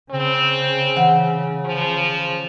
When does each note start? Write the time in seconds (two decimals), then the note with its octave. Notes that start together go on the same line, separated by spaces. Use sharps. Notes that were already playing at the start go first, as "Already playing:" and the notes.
0.11 C#3 C4
0.96 E3 F#5
1.65 F3